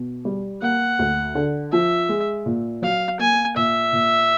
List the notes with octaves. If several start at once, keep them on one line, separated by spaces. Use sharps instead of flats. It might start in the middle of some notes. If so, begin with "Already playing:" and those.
Already playing: B2
G3
A#3 F#5
D2
D3
F3 E5
G#3
A#2
F#3 F5
A#3 G#5
A#2 E5
A#2